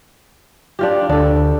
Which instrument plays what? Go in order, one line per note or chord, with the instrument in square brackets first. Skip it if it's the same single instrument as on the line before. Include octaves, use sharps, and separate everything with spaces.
[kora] D4 F4 G4
[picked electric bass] D2 [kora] D4 A4